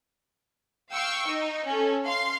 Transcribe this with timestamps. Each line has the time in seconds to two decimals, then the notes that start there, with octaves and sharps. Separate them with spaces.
0.93 F5 G5 C#6 E6
1.29 D#4
1.65 C#4 A4
2.06 F5 C6 C7